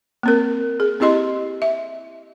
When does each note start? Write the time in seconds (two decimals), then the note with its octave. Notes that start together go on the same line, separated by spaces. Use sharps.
0.23 A#3 C4 A#4
0.80 G#4
1.00 C4 E4 G4 D#5 C6
1.62 E5